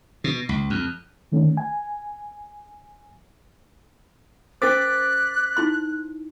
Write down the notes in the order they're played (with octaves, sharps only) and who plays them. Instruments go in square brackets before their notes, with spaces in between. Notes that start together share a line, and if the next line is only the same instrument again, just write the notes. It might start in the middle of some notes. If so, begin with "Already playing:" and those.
[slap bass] B2
C#2
F2
[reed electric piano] D3 D#3 A3 C#4
G#5
[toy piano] C#4 A#4 C5 [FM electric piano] D6 A6 B6 [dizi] F#6
[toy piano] D#4 E4 C6